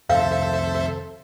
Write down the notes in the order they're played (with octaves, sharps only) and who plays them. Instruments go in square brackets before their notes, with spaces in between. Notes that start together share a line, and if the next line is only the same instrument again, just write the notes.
[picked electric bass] F2 C3 D#3 [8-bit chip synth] A4 C5 E5 [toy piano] F5